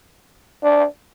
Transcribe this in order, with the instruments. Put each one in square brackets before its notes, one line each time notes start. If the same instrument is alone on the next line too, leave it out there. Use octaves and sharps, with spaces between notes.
[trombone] D4